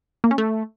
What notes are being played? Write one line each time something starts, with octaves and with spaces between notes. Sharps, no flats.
A#3
C#4
A3